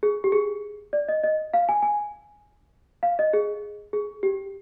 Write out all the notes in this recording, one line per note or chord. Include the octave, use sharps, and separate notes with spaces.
G#4
G4
G#4
D5
D#5
D#5
F5
G#5
G#5
F5
D#5
G#4
G#4
G4